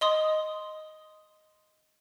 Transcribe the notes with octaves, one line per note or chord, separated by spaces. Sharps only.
D#5 C6 D#6